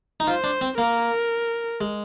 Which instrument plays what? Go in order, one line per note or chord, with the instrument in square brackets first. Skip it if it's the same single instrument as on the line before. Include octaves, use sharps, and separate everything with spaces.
[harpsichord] D#4
[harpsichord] F4 [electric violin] C5
[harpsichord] D4
C4
[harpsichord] A#3 [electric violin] A#4
[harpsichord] G#3